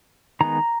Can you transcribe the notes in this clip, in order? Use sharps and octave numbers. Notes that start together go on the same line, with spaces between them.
D#3 G#3 B3 A#5